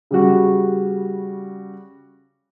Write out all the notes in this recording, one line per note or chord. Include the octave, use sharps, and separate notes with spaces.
C#3 G3 F#4